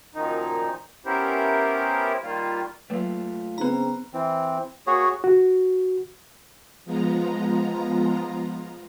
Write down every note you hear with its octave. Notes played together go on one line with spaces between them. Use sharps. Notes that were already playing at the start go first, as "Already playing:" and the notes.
F#2 A#2 D#3 F3 D#4
B3 C#4 E4 G4 A#4 C5
D#3 G3 A#3 F4
F#3 A3 A#3 F4 B4
C#3 B3 C4 D#4 B4 A#5
E3 C4
A#3 F#4 G#4 C#5
F#4
F3 G#3 B3 F4 A#5